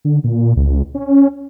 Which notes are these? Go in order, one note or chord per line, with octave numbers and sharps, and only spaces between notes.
D3
A#2
C#2
C#4